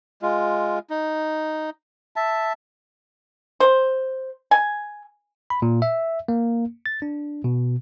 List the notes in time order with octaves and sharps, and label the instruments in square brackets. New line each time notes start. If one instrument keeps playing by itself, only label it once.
[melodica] G#3 F4
D#4
E5 A5
[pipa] C5
G#5
[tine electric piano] B5
A#2
E5
A#3
A6
D4
B2